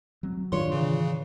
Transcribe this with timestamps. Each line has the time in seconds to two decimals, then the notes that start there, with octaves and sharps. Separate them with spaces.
0.23 F#3 C4
0.52 A2 D#3 D4 F4 C#5 C6
0.72 C#3 E3